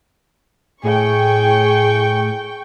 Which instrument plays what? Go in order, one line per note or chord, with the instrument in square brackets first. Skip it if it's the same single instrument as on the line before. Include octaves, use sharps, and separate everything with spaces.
[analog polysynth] A2 [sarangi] G#4 [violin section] G5 C#6